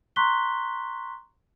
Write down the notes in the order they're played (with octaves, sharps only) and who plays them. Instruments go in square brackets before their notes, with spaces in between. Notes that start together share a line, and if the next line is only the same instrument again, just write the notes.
[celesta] A#5 C6 C#6 F#6 B6 G7